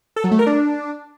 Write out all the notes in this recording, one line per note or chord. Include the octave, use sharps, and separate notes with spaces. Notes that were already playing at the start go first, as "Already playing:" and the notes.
A4
F#3
A3
A#4
D4